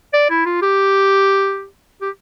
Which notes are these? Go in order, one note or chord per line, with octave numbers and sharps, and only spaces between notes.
D5
E4
F4
G4
G4